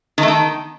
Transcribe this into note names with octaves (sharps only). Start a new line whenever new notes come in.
D#3
A3
D#3